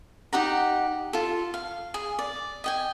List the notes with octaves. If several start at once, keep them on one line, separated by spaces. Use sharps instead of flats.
D#4 G4 F#5 A#5
F4 A4
F5
G#4
D5
D#5 G5 G#5